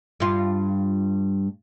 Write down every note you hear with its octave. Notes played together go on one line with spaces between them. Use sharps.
G2 F4